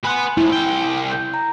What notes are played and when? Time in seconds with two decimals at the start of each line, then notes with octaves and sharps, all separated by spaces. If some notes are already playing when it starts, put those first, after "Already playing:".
0.05 B4 F#5 G#5 C6
0.37 A2 F3 E4
0.52 C2 G5
1.12 G6
1.34 A#5